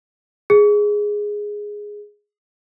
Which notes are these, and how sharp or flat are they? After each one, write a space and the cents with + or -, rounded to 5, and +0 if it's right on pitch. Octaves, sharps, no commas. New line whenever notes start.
G#4 +0